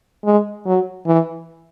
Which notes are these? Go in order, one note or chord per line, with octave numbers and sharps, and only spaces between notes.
G#3
F#3
E3